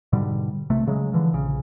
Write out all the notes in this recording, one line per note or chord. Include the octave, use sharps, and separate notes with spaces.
G#2 B2 D3 G3
B1 C3 A3
C#3 F#3 G#3
D3 E3 F3
A#1 C#3